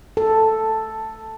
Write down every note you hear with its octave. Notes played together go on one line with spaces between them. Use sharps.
A4